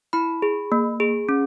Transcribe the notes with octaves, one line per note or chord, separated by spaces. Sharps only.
E4 B5
G#4
A#3
G#4
C#4